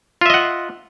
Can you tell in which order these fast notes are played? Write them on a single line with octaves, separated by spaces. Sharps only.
F4 E5 D#5 F#5